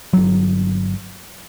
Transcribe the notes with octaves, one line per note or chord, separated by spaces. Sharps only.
G1 F#3